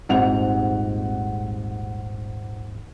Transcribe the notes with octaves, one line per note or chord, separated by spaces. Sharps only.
D#1 G#1 G#2 C4 F#5 F7